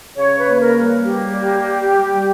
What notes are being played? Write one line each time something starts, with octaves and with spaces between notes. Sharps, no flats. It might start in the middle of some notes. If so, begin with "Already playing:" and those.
C#3 C#5
B4
A#3
A#4
G3
A#3 G4
G3
G3
G3